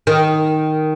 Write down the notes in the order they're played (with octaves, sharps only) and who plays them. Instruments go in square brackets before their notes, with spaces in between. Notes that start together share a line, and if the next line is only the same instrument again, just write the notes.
[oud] D#3